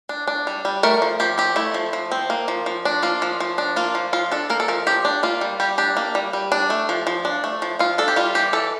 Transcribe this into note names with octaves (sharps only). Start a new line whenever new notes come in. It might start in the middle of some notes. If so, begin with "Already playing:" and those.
D4
D4
G3
G3
A3 A#4
F3
F3 G4
C4 G4
A3 E4
F3
F3
C4
A#3
F3
F3
D4
A#3 F4
F3
F3
D4
A#3 F4
F3
F3 F4
D4 A4
A#3 A#4
A4
F3 A#4
F3 G4
D4
A#3 F4
G3
G3 G4
D4 G4
A#3
G3
G3
D4
A3
F3
F3
D4
A3
F3
F3 F4
D4 A4
G4
G3 F4
E3 G4
E3 A4